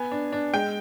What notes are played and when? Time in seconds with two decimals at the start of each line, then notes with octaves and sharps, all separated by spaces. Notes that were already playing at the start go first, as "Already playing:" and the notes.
Already playing: B3 G#5
0.11 D4
0.32 D4
0.53 G#3 G5